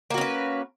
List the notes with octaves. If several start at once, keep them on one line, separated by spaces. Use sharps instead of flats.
A#3 C#4 F#4 B4